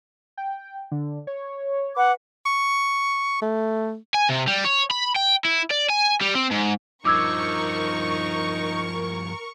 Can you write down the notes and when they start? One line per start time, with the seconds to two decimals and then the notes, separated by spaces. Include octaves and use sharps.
0.37 G5
0.92 D3
1.27 C#5
1.96 B4 F#5 D6
2.46 C#6
3.42 A3
4.15 G#5
4.29 C3
4.48 G3
4.65 C#5
4.91 B5
5.16 G5
5.45 E4
5.71 D5
5.90 G#5
6.21 G3
6.35 C4
6.51 G#2
7.05 G2 F3 D#4 A#4 C#6 D6 E6 G#6